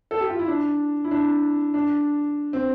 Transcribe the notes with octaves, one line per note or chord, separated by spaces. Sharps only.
A4
G4
F4
E4
D4
E4
D4
D4
C4